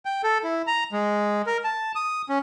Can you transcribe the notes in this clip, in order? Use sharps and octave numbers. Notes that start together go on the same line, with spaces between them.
G5
A4
E4
A#5
G#3
A#4
A5
D#6
C#4